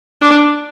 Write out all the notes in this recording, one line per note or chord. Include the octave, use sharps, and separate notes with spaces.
D4